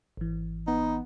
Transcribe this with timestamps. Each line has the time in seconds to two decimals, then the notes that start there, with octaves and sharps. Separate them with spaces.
0.17 G#1 E3
0.67 B3 D#4